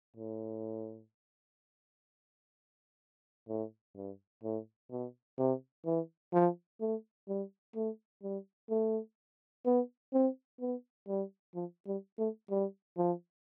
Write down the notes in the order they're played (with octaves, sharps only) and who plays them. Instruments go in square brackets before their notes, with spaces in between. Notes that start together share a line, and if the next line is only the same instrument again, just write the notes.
[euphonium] A2
A2
G2
A2
B2
C3
E3
F3
A3
G3
A3
G3
A3
B3
C4
B3
G3
F3
G3
A3
G3
F3